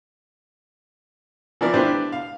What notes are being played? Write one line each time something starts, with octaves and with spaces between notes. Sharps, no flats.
E3 F3 E4 A#4 D5
D4 E4 G4 B4 C5
F5